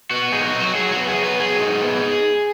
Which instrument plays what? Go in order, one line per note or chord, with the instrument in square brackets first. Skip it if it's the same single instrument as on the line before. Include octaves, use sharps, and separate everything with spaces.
[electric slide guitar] B3 F#4
D#4 G#4
F#4
F#3
F#4
F#3 G#4
B3 F#4
G#4
F#3
B4
F#3 G#4
D#4
B3